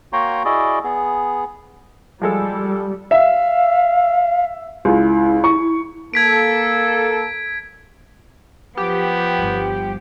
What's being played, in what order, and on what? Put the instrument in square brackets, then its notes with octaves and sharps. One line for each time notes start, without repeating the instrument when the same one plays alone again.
[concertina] A#3 F#4 C#5 G5 A#5 C6
E4 F#4 G#4 D5 D#5
B3 G#4
[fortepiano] F3 G#3 A4 [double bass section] G3
[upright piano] E5 [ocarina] F5
[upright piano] C#2 [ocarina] E4
[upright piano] C#6
[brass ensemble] A#3 A4 [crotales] G#6 B6 D7
[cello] F3 [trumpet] B3 [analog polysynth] G4
[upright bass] G1 G3